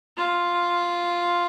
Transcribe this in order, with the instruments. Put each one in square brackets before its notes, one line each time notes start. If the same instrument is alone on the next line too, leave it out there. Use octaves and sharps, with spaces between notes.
[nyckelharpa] F4